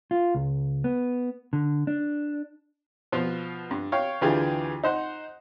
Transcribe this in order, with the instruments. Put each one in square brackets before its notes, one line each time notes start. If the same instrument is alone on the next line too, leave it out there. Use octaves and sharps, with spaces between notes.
[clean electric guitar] F4
C#2
B3
D3
D4
[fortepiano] B2 F3 F4
G2
C#5 F5 G5
D2 E3 D4 F4 G4 G#4
D#4 C5 F#5